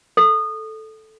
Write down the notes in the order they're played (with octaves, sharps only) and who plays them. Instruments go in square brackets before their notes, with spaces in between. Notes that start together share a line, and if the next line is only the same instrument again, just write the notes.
[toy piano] A4